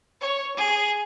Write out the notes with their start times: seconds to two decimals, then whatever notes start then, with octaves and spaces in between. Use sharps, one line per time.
0.21 C#5
0.56 G#4